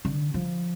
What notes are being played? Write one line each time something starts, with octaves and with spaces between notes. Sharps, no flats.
D3
F3